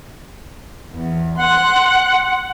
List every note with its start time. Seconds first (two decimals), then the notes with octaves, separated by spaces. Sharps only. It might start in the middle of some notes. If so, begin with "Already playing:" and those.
0.93 E2
1.37 F#5 C6 F#6